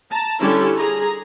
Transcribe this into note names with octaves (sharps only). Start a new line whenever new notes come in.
A5 A#5
D3 G3 C#4 E4 G4 A4
G#4 A#5